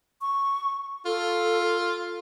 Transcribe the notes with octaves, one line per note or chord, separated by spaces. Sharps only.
C#6
F4 A4